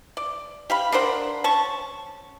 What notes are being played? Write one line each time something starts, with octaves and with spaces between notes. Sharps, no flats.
D5
G4 F5 B5
D4 A#4 C5 F#5
C#4 A5 C#6